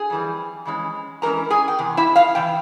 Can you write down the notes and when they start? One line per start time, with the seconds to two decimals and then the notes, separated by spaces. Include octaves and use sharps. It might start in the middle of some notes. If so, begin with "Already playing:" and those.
Already playing: G#4 G#5
0.10 F2 E3 G3
0.65 F2 E3 G#3 C#4
1.22 F2 E3 G#3 C#4 A#4 A#5
1.50 G#4 G#5
1.68 G5
1.79 E2 C3
1.97 E4 E5
2.16 F4 F5
2.35 C3 E3 G5